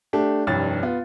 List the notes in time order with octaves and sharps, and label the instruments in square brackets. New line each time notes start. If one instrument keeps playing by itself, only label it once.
[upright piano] A3 D4 G4
F1 C2 G2 C#5 A6
B3 F4